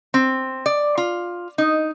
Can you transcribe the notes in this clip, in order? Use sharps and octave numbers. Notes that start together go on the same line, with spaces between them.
C4
D5
F4
D#4